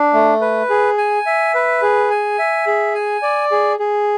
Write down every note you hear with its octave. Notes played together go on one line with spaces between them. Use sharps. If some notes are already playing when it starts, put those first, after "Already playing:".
Already playing: D4
A3
B4
G#4
G#5
E5
B4
G#4
G#5
E5
G#4
G#5
D5
G#4
G#4